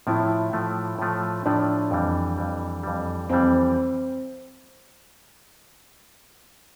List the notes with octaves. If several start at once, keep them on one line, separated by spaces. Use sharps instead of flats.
A2 F3 A3 E4
A2 F3 A3
A2 F3 A3
A2 F3 A3 D4
F2 E3 G3
F2 E3 G3
F2 E3 G3
F2 E3 G3 C4